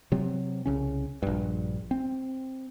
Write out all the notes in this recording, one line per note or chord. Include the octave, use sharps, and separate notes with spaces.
C3 F#3 C4
C2 C#3 C#4
A#1 G2
C4